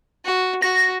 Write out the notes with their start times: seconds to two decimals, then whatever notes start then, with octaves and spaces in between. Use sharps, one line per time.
0.25 F#4
0.62 F#4 A#6